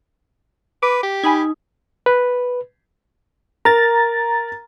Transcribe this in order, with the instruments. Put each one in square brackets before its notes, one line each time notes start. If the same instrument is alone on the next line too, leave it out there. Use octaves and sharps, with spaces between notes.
[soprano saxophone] B4 [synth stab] D6
[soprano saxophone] G4
[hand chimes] D#4 D#6 [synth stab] G#5 B5 G#6
[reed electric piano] B4
[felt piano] A#4 [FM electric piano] A#5 A6